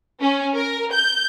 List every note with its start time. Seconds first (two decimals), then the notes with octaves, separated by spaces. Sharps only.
0.20 C#4
0.55 A#4
0.92 G6